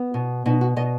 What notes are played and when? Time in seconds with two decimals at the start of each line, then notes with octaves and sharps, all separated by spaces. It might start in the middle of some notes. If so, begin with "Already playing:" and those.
Already playing: B3
0.14 B2
0.46 B2 D#4
0.61 F#4
0.76 B2 D#5